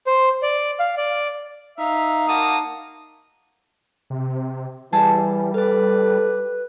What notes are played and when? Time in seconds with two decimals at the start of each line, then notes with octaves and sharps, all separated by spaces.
0.07 C5
0.43 D5
0.79 F5
0.97 D5
1.78 D#4 E5 F5
2.28 A#3 F#4 A5 D#6
4.10 C3
4.93 E3 G3 G#4 A4 A5
5.54 A4 B4 D5 F5